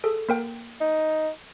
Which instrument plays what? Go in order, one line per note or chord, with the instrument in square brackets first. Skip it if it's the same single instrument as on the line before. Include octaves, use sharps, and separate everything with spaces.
[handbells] G#4 A4
A#3 A#4 G5
[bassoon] D#4